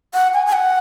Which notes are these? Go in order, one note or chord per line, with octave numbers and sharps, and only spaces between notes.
F#5
G#5
G#5
F#5